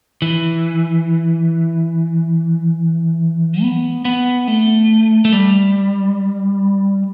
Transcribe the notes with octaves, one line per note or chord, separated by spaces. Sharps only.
E3
B3
B3
A3
A3
G3